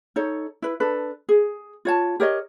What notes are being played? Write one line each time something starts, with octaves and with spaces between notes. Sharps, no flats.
D#4 A4 C#5
E4 B4
D4 A4 B4
G#4
F4 C#5 A5
G4 A#4 C#5 D#5